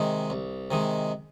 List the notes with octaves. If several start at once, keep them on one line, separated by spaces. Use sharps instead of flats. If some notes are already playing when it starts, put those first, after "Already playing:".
Already playing: C3 D#3 G#3
C2
C3 D#3 G#3